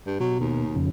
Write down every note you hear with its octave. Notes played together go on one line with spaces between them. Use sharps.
G2
B2 F#3
D#2
F2 C#3